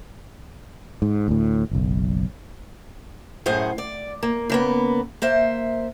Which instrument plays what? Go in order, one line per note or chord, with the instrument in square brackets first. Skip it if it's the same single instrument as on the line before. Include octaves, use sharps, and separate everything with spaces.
[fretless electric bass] G#2
D2 A2
F#1 B1
[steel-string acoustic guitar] F#2 A2 G#4 C5 F#5
D5
A#3
C#3 A#3 B3
A#3 C5 E5